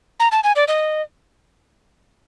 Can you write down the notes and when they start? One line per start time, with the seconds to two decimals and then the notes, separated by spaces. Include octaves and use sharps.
0.20 A#5
0.32 A5
0.44 G#5
0.56 D5
0.68 D#5